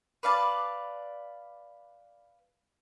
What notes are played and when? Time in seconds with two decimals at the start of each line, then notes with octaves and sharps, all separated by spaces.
0.23 B4 D5 F5 A5